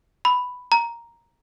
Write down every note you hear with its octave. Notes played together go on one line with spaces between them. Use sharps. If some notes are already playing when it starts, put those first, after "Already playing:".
B5
A#5